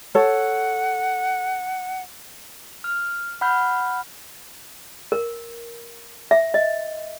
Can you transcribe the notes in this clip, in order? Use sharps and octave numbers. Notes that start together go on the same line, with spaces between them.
A4 C#5 F#5
F6
F#5 B5 F6 G6
A#4
E5
D#5